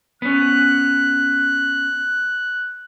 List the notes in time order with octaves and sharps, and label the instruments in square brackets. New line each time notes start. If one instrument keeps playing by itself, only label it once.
[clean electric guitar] B3 C#4 [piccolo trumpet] F#6